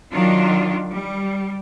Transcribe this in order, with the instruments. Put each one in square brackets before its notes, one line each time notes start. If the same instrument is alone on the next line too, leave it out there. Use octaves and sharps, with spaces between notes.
[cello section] D#3 F#3 D4 F4
G3